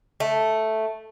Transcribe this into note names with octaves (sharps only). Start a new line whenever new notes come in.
A3